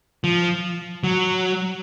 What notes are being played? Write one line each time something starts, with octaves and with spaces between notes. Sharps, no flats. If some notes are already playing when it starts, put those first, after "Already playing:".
F3
F#3